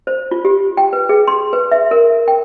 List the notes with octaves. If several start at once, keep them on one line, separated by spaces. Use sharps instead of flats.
C5
F4
G4
G5
B4
G#4
C6
B4
E5
A#4
G5